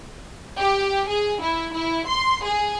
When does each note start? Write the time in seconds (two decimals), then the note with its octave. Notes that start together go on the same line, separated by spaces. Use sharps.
0.59 G4
1.08 G#4
1.41 E4
1.74 E4
2.07 C6
2.45 G#4